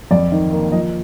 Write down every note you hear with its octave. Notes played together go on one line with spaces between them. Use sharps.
F2 D5
D#3
A#3
F3 D#5